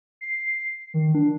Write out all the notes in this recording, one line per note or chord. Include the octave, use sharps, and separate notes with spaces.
C7
D#3
D4